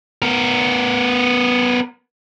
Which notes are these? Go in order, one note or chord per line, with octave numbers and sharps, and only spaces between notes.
B3 A#4